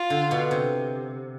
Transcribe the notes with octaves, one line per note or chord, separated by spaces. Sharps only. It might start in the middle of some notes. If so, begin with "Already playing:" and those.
Already playing: F4
D3
B2
C3